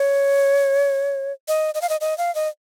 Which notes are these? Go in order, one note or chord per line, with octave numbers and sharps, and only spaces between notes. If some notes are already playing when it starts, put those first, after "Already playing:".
Already playing: C#5
D#5
D#5
F5
D#5
D#5
F5
D#5